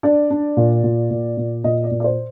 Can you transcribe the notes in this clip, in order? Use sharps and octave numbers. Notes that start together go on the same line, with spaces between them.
D4 D5
D4
A#2
A#2
A#2
A#2
A#2 D#5
D5
A#2
D5
C5